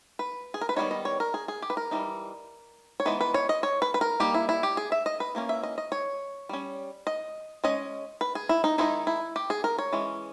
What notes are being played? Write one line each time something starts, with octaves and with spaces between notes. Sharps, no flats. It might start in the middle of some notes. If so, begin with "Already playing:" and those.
B4
G#4
A#4
B4
D#3 G3 B3 D#4 C#5
D#5
C#5
A#4
G#4
G#4
G4
B4
A#4
E3 G3 A#3 D#4
C#5
E3 G#3 B3 D#4 B4
B4
C#5
D#5
C#5
B4
B4
A#4
G3 A#3 D#4 G4
E4
E4
G4
G#4
E5
D#5
B4
E3 A#3 C#4
E5
D#5
D#5
C#5
G3 C#4
D#5
G#3 C#4 D#5
B4
G#4
E4
D#4
D#3 G#3 D#4 E4
E4
G4
G#4
A#4
C#5
E3 G#3 C#4